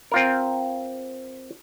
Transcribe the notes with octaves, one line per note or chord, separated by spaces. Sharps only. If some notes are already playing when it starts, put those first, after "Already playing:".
C4 F4 A#4